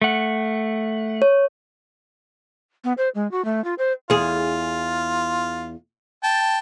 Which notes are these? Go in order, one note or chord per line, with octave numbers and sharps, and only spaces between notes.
A3 F#5
C#5
B3
C5
G#3
F#4
A3
F4
C5
E2 F4 G#4
G5 A5